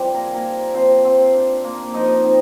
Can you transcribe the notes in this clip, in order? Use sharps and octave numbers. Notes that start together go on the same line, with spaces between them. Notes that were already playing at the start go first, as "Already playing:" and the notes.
Already playing: F3 G3 C4 D5
A#3 A#4
G#4
A#3 A#4
F3
F3 C4 C5
C4
D4
A#3
F3 D#4 D#5
C4